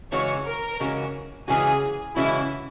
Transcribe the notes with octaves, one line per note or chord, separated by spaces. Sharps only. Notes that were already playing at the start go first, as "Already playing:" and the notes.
C#3 E3 G#3 C#4 F#4 C#5
A#4
C#3 E3 G#3 C#4 F#4
C#3 E3 G#3 C#4 F#4 G#4
C#3 E3 G#3 C#4 E4 F#4